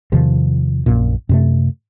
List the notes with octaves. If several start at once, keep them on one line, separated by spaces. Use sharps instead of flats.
E2 C3 D#3 F3
A#1 F#2 A#2
F#2 C3 A3